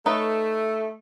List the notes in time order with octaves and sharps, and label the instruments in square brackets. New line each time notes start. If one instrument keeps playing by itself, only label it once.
[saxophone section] A3 [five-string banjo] D#4 B4 C#5